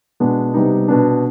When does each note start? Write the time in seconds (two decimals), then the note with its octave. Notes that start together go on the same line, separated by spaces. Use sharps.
0.20 B2 G#3 B3 D4
0.54 C3 G3 B3 D#4
0.88 B2 B3 D4